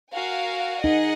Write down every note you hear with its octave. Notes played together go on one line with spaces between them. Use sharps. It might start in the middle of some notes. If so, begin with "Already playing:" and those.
F#4 A#4 F5 G#5
D#4 G#4 D#5 F#5